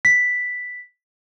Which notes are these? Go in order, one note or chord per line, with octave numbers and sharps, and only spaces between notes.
B6